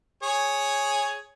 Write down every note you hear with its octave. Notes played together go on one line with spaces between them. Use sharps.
G#4 C#5